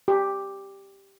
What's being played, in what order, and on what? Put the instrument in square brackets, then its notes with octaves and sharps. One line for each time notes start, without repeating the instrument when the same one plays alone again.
[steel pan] G4